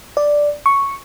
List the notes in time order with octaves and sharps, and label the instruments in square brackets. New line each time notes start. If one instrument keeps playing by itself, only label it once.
[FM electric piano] D5
C#6